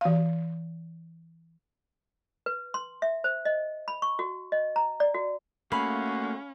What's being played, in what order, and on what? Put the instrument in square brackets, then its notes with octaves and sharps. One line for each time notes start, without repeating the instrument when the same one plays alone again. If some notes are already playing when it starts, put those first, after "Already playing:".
[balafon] E3 F5
[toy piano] B4
C6
E5
C5
D#5
B5
C#6
F#4
D#5
A#5
D5
F#4
[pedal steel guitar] A3 A#3 G#4 [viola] C#4 [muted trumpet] F#4 [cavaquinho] F5 B5